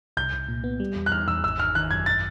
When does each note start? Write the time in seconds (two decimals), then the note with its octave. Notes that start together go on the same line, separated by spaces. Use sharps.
0.17 C2 G6
0.33 C2
0.48 A#2
0.64 B3
0.80 G3
0.96 E2
1.06 F#6
1.12 E2 F6
1.28 E2 E6
1.43 G#1 E6
1.59 G#1 F6
1.75 D#3 F#6
1.91 F#2 G#6
2.06 A6